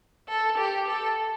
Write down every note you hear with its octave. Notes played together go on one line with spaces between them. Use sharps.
A4
G4
A4